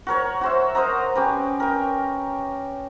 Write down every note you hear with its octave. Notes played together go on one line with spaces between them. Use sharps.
F#4 A#4 C#5
F#4 C5 E5
A#4 C5 D#5 A#5
C#4 G4 B4
A#4 G5